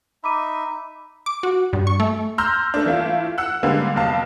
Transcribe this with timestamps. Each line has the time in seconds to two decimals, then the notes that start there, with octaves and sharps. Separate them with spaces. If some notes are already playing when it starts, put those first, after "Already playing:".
0.24 D#4 E5 B5 D6 D#7
1.26 D6
1.43 F#4
1.73 G2
1.87 C#6
2.00 A3
2.38 A#5 C6 E6 F6 G6 A#6
2.74 A3 D4
2.86 E3 A3 E4 F4
3.38 F#5 E6 F#6
3.63 D3 G3 G#3 A#3
3.96 F1 B1 F5 A5